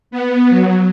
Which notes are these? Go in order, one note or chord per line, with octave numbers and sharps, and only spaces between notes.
B3
F#3